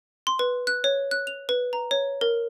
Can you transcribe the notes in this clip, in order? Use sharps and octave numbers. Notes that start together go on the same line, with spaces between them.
C6
B4
F#6
C#5
F#6
F7
B4
A#5
C#5
A#4